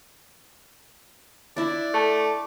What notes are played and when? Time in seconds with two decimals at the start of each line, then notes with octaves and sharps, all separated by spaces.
1.57 D4 E4 D5
1.94 A3 A5